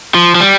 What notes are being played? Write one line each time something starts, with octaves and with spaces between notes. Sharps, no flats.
F3
F3
G3